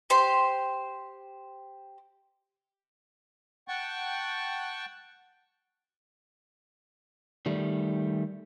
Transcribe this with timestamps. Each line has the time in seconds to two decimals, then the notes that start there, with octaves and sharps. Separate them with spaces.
0.10 G4 C5 C6
3.68 F#5 G5 A5 C#6
7.46 D#3 G3 A3